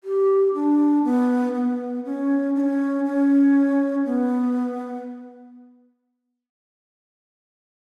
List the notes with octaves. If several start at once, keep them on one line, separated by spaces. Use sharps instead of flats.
G4
D4
B3
B3
C#4
D4
C#4
C#4
B3